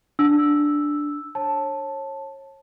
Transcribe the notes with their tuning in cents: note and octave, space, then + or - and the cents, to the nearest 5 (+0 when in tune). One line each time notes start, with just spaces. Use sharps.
D4 +0 E6 +0
C#5 -30 A5 +0